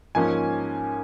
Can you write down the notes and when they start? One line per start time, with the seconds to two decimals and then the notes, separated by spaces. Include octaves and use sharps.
0.15 G#2 F3 A#3 C#4 G#5